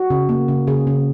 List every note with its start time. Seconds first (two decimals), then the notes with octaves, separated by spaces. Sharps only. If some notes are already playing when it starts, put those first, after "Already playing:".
Already playing: F#4
0.10 C#3
0.29 A#3
0.48 C#3
0.67 C#3 G#4
0.87 C#3